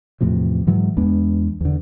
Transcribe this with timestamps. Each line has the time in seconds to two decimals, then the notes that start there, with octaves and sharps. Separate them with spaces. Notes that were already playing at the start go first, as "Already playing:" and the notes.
0.21 E2 A2 C3 F3
0.67 G#2 E3 F#3 G#3
0.97 E2 G#3 B3 D4
1.61 E2 D3